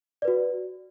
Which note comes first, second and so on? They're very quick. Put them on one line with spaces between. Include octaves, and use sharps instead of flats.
D5 B4 F#4